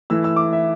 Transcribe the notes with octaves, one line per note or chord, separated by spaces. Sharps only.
E3 A3 E4 E6
E6
D6
E5